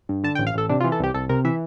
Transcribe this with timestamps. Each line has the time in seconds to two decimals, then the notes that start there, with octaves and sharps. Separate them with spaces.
0.09 G2
0.24 D3 A5
0.35 G5
0.39 A1
0.47 F5
0.54 A1 A4
0.69 C3 D4
0.80 F4
0.84 E3
0.92 A4
0.99 C2 G4
1.14 C2 A4
1.29 C3 A#4
1.44 E3 E5